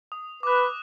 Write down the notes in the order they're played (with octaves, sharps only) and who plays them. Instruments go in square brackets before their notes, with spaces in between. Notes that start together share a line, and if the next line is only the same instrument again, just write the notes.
[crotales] D#6
[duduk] B4 [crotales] D6 F#6